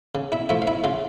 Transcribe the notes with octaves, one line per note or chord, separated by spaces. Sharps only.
C#3
E4 E5
F3 A3 E4 E5
F5
E4 E5
C#3 F4 F5